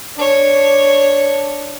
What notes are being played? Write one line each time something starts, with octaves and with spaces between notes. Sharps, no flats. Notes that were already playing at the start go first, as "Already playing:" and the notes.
D4 C#5